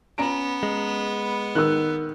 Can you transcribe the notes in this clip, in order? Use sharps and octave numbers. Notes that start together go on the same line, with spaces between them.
B3 C#4 A#5 D7
G#3
D#3 A#4 E6 F#6